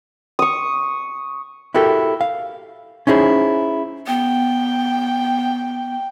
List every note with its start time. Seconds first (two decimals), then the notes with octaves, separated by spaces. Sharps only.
0.39 C#6 D#6
1.74 E4 F#4 G4 A4 A#4
2.21 F5
3.07 C#4 D#4 E4 G#4 C5
4.07 B3 G5